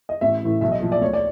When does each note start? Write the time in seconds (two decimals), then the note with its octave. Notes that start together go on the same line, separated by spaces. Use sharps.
0.09 D#5
0.21 A1 E5
0.42 A2 E3
0.61 B1 E5
0.72 D#5
0.82 A#2 F3
0.92 D5
1.01 D2 C#5
1.13 D5